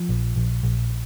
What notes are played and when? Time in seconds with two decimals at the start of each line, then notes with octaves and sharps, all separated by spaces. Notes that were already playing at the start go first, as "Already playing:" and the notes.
Already playing: F3
0.09 A#1
0.36 A#1
0.63 A#1